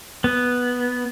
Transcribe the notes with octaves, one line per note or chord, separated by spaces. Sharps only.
B3